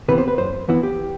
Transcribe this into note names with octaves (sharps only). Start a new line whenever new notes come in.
C3 E3 B3 B4
C5
B4
F#2 C5
E3 B3 E4
G4